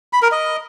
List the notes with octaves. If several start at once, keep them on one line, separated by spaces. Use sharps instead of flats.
B5
A#4
D#5